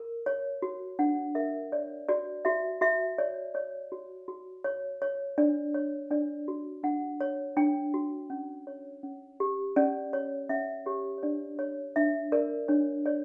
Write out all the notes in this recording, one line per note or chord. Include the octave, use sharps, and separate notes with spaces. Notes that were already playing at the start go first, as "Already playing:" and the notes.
Already playing: A#4
C#5
F#4
D4 F#5
A#4 E5
C#5 D5
F#4 D5
F#4 E5
F#4 E5
C#5 D5
C#5 D5
F#4
F#4
C#5
C#5
D4 D5
C#5
D4 D5
F#4
D4 F#5
C#5
D4 G5
F#4
C#4
C#5
C#4
G4
C#4 D5
C#5
C#4 E5
G4 C#5
C#5
D4 D5
C#5
D4 E5
A#4 D5
D4 C#5
C#5 D5